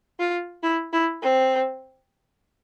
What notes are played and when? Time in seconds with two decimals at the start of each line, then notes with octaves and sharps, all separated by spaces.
0.19 F4
0.63 E4
0.93 E4
1.23 C4